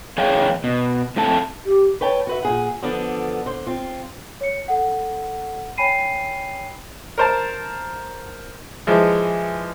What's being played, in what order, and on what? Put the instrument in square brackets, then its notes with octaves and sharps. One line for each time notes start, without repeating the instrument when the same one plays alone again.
[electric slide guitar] E2 G#4 C#5 F5 G5
B2
A2 A3 C4 A4 A5
[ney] G4
[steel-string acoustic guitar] B4 C#5 G5 A5
F#4 B4 E5
A#2 G#4 F#5
D3 F3 B3 D4 A4
D3 C5
C4 F4
[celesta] C#5 C#7
A4 F#5
C#5 G5 G#5 B5 C7 D#7
[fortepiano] A#4 C5 A5
E3 F3 G#3